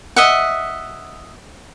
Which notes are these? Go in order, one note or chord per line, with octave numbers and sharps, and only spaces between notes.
D#5 E5 F#5